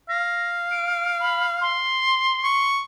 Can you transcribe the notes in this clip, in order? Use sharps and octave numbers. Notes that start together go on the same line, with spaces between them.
F5 A#6
D7
B5
C6
C#6